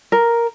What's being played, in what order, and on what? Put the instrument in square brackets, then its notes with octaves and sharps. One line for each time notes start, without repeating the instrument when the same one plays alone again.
[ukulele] A#4